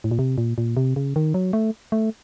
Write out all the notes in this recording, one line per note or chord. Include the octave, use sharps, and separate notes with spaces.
A2
A#2
C3
A#2
A#2
C3
C#3
D#3
F#3
A3
A3